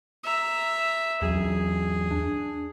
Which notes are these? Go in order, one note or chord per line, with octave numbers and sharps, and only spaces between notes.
E5 A#5
E2 F#3 G#4
D4